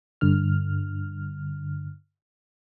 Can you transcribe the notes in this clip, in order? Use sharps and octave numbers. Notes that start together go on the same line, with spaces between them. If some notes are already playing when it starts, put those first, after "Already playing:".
G2 D3 F6